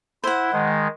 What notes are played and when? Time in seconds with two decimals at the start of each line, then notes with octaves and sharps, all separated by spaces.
0.24 E4 C5 F#5
0.53 D#3 G#3